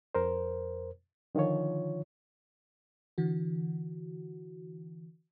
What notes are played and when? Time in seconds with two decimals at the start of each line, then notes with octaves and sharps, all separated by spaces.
0.15 F2 A#4 C5
1.35 D3 D#3 F3 F4 C#5
3.18 D3 E3 F#4